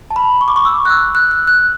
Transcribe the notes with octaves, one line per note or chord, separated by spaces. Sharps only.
A5
B5
C#6
D6
C#6
E6
F#6
E6
F#6
F#6
F#6